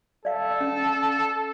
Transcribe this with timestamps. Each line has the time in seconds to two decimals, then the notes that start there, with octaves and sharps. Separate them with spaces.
0.25 A4 D5 F5
0.61 C#4